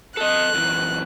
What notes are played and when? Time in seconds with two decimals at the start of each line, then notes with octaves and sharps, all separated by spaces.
0.17 A4 D#5 F#6
0.55 F#2 E3